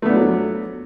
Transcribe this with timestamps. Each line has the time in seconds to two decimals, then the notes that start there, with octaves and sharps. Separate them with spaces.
0.02 A3
0.06 B3
0.09 D4
0.12 F3
0.16 F#3